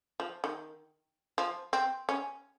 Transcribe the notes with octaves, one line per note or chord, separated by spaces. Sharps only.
F3
D#3
F3
C4
C#4